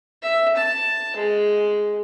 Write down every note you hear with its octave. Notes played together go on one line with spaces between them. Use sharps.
E5
A5
G#3